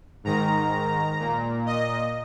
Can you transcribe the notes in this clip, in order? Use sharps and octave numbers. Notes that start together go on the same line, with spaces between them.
G#2 D#3 A#5
A#2
D#5